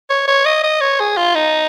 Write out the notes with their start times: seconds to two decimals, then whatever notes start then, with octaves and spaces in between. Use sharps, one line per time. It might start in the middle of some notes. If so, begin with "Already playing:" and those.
0.10 C#5
0.28 C#5
0.45 D#5
0.64 D#5
0.81 C#5
1.00 G#4
1.17 F4
1.35 D#4